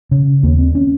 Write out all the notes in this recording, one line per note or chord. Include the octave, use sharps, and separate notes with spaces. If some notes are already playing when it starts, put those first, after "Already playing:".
C#3
D#2 A#3
C4
C#4